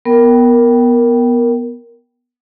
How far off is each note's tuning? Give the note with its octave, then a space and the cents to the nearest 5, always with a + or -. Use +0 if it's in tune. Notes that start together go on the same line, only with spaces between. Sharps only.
B3 -10 A#4 +0 G5 -15